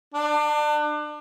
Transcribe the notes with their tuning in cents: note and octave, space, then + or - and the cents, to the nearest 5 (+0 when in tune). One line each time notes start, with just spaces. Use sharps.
D4 +30